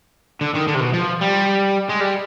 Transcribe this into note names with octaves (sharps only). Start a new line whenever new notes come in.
D3
D#3
D3
C3
B2
F3
G3
G#3
G3